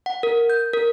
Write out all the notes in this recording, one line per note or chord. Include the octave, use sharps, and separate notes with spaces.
F#5
A#4
G6
A#4